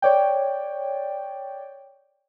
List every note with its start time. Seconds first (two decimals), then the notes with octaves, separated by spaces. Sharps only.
0.02 C#5 D5 G5